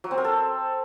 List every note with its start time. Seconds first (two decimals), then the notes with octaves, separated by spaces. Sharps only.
0.04 F#3
0.11 C4
0.18 A#4
0.25 A4